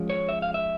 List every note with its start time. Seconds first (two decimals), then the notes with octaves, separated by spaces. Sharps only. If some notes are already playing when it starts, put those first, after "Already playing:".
Already playing: F3 G#3 C#4 F4
0.10 C#5
0.29 E5
0.42 F5
0.54 E5